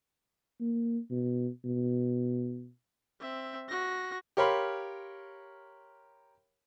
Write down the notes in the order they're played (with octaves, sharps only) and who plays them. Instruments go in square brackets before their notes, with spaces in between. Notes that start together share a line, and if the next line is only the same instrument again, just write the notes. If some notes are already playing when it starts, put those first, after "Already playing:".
[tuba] A#3
B2
B2
[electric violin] C4 E5
F#4 A#6
[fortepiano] G4 A#4 C#5 F5 B5 C6